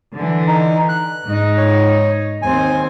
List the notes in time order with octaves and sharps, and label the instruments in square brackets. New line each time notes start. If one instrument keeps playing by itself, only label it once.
[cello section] D3 E3
[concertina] D#4
F#6
[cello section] G#2 D#4
[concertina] C#5
[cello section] D#2 C4 C5 [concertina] G#5